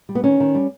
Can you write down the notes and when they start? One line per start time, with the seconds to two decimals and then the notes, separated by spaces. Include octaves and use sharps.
0.09 G3
0.15 B3
0.24 D#3 C#4
0.40 D#3
0.55 G3